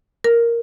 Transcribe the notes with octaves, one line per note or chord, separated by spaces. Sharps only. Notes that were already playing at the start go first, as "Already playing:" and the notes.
A#4